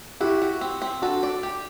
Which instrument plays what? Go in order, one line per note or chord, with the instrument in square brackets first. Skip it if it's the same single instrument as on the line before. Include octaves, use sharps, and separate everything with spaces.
[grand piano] E4 G4 [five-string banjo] F#4
[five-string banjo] F#4
C4
C4
[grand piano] D4 F#4 [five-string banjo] A4
[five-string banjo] D5
G4